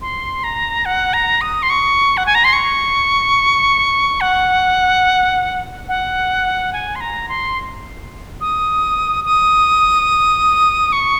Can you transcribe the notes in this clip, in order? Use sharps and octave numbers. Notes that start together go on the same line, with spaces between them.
C6
A#5
F#5
A#5
D#6
C6
C#6
F#5
G#5
A#5
C6
C#6
F#5
F#5
G#5
C6
A#5
C6
D#6
D#6
C#6